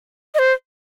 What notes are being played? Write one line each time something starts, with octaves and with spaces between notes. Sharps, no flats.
D#5
C5